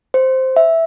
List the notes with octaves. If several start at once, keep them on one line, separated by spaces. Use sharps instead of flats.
C5
E5